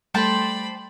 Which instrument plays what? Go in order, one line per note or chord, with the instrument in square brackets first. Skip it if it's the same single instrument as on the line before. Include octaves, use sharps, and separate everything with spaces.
[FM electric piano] G3 A3 A4 [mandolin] C5 G5 A5 [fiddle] D5 B5